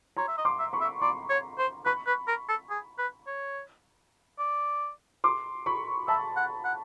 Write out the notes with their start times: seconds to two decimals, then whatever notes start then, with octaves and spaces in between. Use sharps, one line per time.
0.17 C#5 A#5 C6
0.28 E5
0.38 D#5
0.45 C6 D6
0.59 E5
0.73 B5 C#6
0.81 E5
1.01 D5 A#5 C6
1.29 C#5
1.58 C5
1.86 B4 B5 C#6
2.07 B4
2.28 A#4
2.49 A4
2.70 G#4
2.98 B4
3.27 C#5
4.39 D5
5.24 C6 D6
5.66 B5 C#6
6.08 E5 A5 B5
6.36 F#5
6.65 F#5